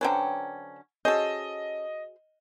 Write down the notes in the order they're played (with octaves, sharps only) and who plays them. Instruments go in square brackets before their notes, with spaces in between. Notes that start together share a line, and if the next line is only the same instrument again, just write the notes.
[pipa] D3 F#3 C#4 [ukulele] B4 C5 G5
[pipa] C#4 A4 [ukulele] F#4 G#4 C5 [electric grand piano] D#5